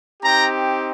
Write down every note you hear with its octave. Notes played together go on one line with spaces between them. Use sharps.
C4 D#4 G4 G5 A#5